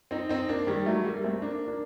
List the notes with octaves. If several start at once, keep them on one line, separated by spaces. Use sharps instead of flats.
C4 D#4
C4 D#4
A#3 D4
D#3 G3
F#3 A3
G3 A#3
A3 C4
A#3 D4
A#3 D4